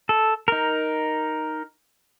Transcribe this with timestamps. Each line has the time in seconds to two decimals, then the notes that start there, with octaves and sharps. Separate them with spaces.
0.09 A4
0.48 D#4 A#4